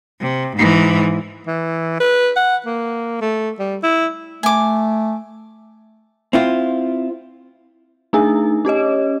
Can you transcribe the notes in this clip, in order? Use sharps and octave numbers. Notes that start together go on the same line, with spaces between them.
C3
G#2 E3
E3
B4
F#5
A#3
A3
G3
E4
A3 G#5 D6
C4 E4 F4
A3 D4 D#4 G#4 G#5
C#4 G4 C#5 D#5